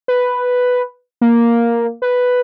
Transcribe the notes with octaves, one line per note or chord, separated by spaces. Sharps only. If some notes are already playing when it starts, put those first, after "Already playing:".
B4
A#3
B4